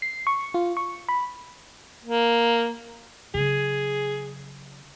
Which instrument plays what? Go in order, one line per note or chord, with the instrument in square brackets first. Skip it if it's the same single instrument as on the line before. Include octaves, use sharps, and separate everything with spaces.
[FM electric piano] C7
C#6
F4
C#6
B5
[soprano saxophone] A#3
[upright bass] C#3 F#3 [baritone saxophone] G#4